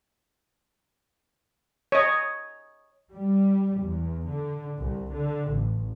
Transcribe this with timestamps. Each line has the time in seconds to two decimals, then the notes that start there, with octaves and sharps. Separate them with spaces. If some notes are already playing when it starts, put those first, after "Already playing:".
1.92 C#5 D#5
3.12 G3
3.82 E2
4.28 D3
4.78 C2
5.13 D3
5.51 A1